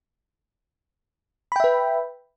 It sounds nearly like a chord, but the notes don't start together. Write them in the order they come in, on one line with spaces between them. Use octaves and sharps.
B5 G5 E5 B4